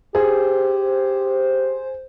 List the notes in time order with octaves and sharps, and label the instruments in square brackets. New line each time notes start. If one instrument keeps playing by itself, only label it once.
[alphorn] G4 [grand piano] G#4 [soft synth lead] C5